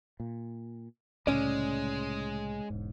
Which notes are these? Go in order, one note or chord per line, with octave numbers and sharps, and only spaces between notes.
A#2
C2 A2 C#3 G#3 C#4 D5
E1 G#2